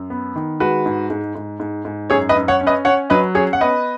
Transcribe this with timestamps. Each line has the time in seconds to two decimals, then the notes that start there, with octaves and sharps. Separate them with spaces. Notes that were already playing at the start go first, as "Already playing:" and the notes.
Already playing: F#2
0.10 B3
0.36 D#3
0.60 G#3 F#4 B4
0.86 G#2
1.10 G#2
1.35 G#2
1.60 G#2
1.85 G#2
2.10 F#2 G#4 C#5
2.29 B4 D#5
2.36 F#2
2.48 C#5 F#5
2.61 C#4
2.67 B4 D#5
2.85 C#4 C#5 F#5
3.10 F#3 B4 D#5
3.35 C#4 G#4 C#5
3.53 F#5
3.61 B3 B4 D#5